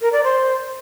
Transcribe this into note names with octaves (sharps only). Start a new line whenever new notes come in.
A#4
D5
C5